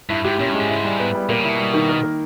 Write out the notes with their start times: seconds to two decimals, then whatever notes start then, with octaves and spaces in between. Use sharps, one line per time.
0.09 G2 E4
0.24 G#2 G4
0.39 A#2 C#4
0.49 G2 G#3
0.59 G#2
0.69 E4
0.84 G3
1.00 B3
1.14 G3
1.29 A#2 A#3
1.39 C#3
1.44 E4
1.49 B2
1.59 G3
1.74 D#3
1.89 A#4
2.03 A#3